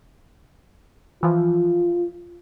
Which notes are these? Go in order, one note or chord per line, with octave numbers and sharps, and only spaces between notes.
E3 F3 F4